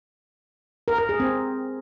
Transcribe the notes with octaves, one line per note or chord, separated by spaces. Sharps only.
A#4
A#4
G#4
C4